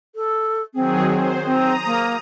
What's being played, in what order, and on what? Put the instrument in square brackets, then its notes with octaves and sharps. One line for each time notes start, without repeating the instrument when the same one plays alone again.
[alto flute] A4
[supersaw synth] D#3 F#3 G#4 [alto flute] C4
[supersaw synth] C5
[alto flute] C4 [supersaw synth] A#5 D#6
[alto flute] A#3